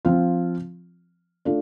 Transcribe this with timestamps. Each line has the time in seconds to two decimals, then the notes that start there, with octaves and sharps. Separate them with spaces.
0.05 F3 C4 F4
1.45 A3 D4 F4